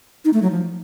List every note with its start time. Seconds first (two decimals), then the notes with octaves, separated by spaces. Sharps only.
0.25 D#4
0.33 A3
0.42 F#3
0.51 F3